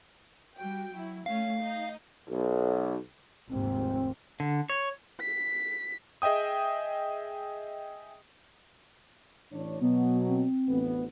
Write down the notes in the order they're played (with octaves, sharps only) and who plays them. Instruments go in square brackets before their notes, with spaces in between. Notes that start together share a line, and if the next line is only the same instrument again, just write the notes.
[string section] G3 F#4 G5
F#3 E4
[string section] A3 C#4 [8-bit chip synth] F5
[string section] D#4 D#5
[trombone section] B1
[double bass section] F1 D#2 G#2 [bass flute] C4
[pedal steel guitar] D3
C#5
[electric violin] B6
[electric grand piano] G#4 D#5 E5 G5 D#6
[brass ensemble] A1 D4 C#5
[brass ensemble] B2 F#3 [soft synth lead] B3
[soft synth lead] C4
[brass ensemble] A1 D2 B3